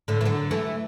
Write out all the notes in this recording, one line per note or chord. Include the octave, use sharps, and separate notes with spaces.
A2 D3
E3
D3 F#3
E3 A3